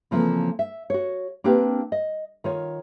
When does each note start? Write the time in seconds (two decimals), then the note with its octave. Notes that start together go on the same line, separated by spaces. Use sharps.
0.11 C#3 E3 F3 A3 A#3 C4
0.59 E5
0.90 F#4 C#5
1.44 A#3 C4 D4 G4 A#4 B4
1.92 D#5
2.44 D#3 F4 C#5